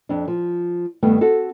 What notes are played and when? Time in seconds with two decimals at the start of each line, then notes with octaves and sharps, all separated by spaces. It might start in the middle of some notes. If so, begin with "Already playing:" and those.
0.09 F2 D4
0.28 F3
1.03 G2 D#3 A3 B3
1.21 C4 F#4 A4